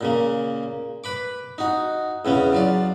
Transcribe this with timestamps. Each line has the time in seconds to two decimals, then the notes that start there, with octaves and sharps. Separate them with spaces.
0.01 A#2 C#3 A#3
1.04 B4 B5 D6
1.58 D#4 F#4
2.25 E2 C#3 B3 C#4
2.53 F#3 F4 D5